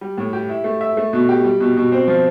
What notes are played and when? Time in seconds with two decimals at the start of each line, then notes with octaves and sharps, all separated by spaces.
0.01 G3
0.18 A2
0.33 G4
0.49 E4
0.64 A3
0.81 E5
0.97 A3
1.13 B2
1.29 G4
1.44 G3
1.60 B2
1.77 B2
1.92 C4
2.08 F3